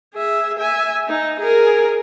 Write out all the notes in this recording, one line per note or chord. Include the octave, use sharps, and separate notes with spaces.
G#4 E5
E5 G#5
D#4
G#4 A#4